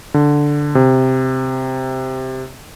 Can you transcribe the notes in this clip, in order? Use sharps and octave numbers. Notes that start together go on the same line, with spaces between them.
D3
C3